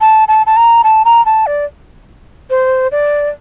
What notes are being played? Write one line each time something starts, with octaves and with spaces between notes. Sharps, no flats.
A5
A5
A5
A#5
A5
A#5
A5
D5
C5
D5